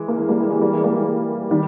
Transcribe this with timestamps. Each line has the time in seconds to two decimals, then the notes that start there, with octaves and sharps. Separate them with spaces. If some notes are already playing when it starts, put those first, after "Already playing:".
Already playing: E3 G#3
0.08 A#3
0.17 E3 G#3
0.29 G3 A#3
0.40 E3 G#3
0.50 E3 G#3
0.61 G3 A#3
0.73 E3 G#3
0.84 G3 A#3
0.95 E3 G#3
1.51 D#3 G3